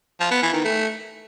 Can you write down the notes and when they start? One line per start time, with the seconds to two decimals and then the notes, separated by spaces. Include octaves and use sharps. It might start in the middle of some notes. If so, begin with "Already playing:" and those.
0.20 F3
0.31 B3
0.42 E3
0.53 D#3
0.64 A3